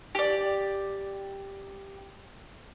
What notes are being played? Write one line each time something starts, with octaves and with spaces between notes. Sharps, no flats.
G4 D5